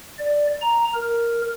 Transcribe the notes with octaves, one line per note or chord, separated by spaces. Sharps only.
D5
A#5
A#4